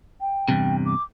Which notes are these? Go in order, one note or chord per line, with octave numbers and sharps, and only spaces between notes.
G5
E2 G2 C3
D6